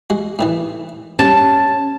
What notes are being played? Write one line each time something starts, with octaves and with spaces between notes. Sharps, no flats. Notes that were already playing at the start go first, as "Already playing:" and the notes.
G#3 F#4
A2 D#3 E3
G2 C#4 A5